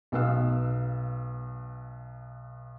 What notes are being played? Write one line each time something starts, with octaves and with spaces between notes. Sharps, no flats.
B1 B3 F5 E6